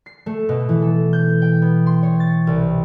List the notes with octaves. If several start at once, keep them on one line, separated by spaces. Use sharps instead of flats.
C7
A3
B2
E3
A4
G6
G5
B3
C6
C#5
A6
C2